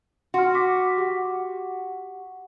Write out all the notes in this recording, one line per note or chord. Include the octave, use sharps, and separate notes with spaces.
F#4 C6 F6
C#6 D6 B6
G4 F#5 C#6